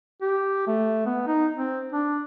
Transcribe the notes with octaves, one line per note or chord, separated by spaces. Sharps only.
G4
A3
B3
D#4
C4
D4